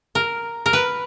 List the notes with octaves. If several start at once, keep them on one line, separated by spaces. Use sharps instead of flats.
A#4
A#4
B4